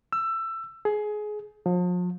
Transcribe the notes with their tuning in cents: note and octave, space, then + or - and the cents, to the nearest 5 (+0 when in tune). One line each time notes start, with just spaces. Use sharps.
E6 +20
G#4 +20
F3 +40